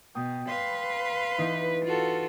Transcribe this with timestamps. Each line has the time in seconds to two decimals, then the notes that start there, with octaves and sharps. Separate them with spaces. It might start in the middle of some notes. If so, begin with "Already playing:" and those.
0.15 B2 G5 D#6
0.47 B4 F5 C6
1.38 E3 B3 D#4
1.85 F4 F#4 A4